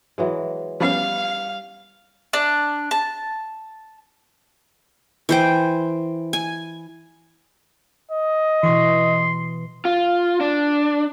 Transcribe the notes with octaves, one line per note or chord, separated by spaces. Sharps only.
E3 F#3 G#3
F3 G3 B3 C#4 F5
D4
A5
E3 C5 G5
G#5
D#5
B2 E3 C6 C#6 C#7
F4
D4